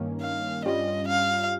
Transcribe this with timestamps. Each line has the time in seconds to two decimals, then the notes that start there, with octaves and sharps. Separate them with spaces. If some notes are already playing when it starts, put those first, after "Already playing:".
Already playing: G2 D#3 A#3 C#4
0.22 F5
0.65 G2 G3 C#4 F4 D#5
1.08 F5